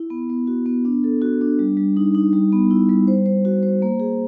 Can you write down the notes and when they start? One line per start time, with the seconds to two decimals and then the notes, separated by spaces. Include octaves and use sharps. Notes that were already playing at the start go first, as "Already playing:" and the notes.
Already playing: E4
0.10 B3
0.30 B3
0.47 F#4
0.66 B3
0.85 D4
1.04 A4
1.22 F#4
1.41 D4
1.59 G3
1.77 G3
1.97 D#4
2.14 D#4
2.33 G3
2.52 B3
2.71 E4
2.89 G3
3.07 C5
3.26 C5
3.45 F#4
3.63 C5
3.82 A#3
4.00 G#4